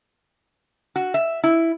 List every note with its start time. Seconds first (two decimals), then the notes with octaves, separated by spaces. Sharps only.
0.96 F#4
1.14 E5
1.43 E4